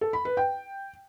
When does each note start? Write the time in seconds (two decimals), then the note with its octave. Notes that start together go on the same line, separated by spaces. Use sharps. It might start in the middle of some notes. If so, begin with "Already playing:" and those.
0.01 A4
0.13 B5
0.25 B4
0.37 G5